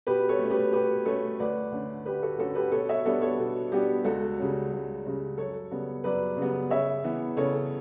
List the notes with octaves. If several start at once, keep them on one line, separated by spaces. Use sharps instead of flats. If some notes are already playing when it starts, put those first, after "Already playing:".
B2 G4 B4
A4 C#5
A3
C#4
G4 B4
B2 G4 B4
A3 C#4 A4 C#5
D2 B4 D5
D3 A3 C#4
D2 G4 B4
F#4 A4
D3 A3 C#4 F#4 A4
G4 B4
B2 A4 C#5
C#5 E5
G3 B3 D4 A4 C#5
A4 C#5
B2
G3 B3 D4 G4
C#2 F#4 A4
C#3 G3 C#4
C#2
C#3 G3 C#4
F#2 A4 C#5
C#3 G3 B3
F#2 B4 D5
C#3 G3 B3
C#3 C#5 E5
E3 B3
C#3 A4 C#5